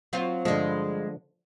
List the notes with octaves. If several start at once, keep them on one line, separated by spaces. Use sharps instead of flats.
F#3 C4 F4
G2 D3 F3 G#3